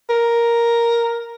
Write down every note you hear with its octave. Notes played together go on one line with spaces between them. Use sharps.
A#4